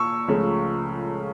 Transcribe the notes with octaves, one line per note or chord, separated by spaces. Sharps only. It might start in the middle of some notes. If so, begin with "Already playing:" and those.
Already playing: A#2 A5 C#6 E6
C#2 C#3 F3 A3